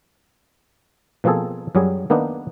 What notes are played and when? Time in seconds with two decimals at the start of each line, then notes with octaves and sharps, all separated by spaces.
1.24 B2 F3 A#3 C4 G#4 A4
1.75 F#2 F#3 G3 G#4
2.10 D#3 A#3 B3 D4 D#4